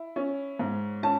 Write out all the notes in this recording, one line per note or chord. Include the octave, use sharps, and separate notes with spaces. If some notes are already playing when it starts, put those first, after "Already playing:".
Already playing: E4
C#4
G#2
C#4 A5